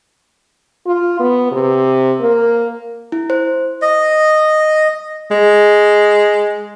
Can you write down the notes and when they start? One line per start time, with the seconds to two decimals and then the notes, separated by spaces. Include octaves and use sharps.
0.87 F4
1.20 B3
1.52 C3
2.20 A#3
3.12 E4
3.30 C5
3.82 D#5
5.31 G#3